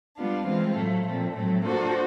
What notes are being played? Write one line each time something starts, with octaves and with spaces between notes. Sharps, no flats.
G3 B3 D4 F4
E3 G#3 C4 F4
A2 F#3 A3
A#2 F3 A3 C4
A2 F#3 A3 C4
A#3 D4 F#4 A4 C5